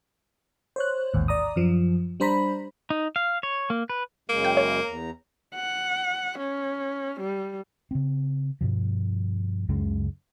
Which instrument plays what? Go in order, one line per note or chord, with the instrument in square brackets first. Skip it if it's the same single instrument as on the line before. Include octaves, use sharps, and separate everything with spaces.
[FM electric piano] C5 C#5 F#6
A1 D#2 G#2
D5 A#5 D#6
F#2 F3
G3 D4 C5 A#5 B5
[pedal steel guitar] D#4
F5
C#5
A#3
B4
[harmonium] F#2 C#3 G#3 [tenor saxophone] A#3
[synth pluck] G5
C#5
[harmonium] E2 A#5
[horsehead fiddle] F#5
C#4
G3
[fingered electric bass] C#3 C4
G2 B2 F3
C#2 F#2 C#3 G#3